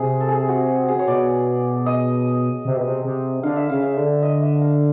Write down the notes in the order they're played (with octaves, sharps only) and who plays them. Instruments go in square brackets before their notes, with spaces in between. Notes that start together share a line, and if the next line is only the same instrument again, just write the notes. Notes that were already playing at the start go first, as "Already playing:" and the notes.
Already playing: [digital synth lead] C3 [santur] G#4
[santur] A4
G#4
F#4
G#4
C#5
[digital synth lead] B2 [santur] D5
[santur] D#5
[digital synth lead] C3
B2
C3
C3
[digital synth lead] D3 [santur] F5
[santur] E5
[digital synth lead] C#3 [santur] F5
[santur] E5
[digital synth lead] D3
[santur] D#5
E5
F5